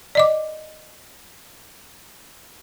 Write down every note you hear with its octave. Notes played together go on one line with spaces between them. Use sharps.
D5 D#5 D6